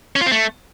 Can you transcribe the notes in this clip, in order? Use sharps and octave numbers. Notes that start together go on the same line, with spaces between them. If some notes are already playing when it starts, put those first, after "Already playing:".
C#4
F4
C4
A3